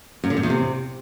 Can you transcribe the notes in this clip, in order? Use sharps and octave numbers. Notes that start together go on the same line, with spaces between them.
F#2
D3
F#2
E2
C3